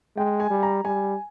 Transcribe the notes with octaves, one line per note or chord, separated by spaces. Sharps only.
G#3 G5
G#5
G3
A#5
G3 G#5